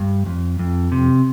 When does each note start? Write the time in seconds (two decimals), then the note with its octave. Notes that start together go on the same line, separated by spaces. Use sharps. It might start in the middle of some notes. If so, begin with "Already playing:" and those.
Already playing: G2
0.26 F2
0.59 F2
0.92 C3